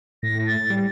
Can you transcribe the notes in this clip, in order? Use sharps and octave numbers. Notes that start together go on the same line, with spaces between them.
A2 A#6
A6
G3